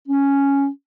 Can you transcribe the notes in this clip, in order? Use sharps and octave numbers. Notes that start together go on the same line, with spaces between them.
C#4